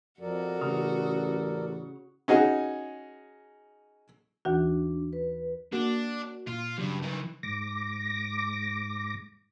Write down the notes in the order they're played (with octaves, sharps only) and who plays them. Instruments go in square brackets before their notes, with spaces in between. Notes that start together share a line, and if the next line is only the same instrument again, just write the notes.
[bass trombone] F2 [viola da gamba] F#4 [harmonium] A4 A#4 D5
[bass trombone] A1 [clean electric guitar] C#3
[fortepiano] C#4 D#4 F#4 G#4
[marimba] D#2 E3 F#4 [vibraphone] D4
[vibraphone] B4
[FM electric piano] A#3 F#4 [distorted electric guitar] D4
[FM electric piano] A#2 [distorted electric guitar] F4
[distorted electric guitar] G2 [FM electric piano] C#3 F#3
[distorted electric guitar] D#3 E3
[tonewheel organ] G#2 D6 A#6